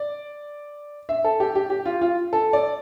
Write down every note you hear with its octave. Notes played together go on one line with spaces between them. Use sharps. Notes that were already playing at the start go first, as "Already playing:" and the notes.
Already playing: D5
E5
A4
G4
G4
G4
F4
F4
A4
D5